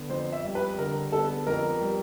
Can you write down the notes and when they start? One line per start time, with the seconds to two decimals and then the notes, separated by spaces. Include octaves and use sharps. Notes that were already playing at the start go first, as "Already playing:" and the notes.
Already playing: D3 B3
0.10 F2 C5
0.32 E5
0.44 G3
0.55 B4
0.78 D3 A#4
1.12 B3 A4
1.47 F2 A#4
1.81 G3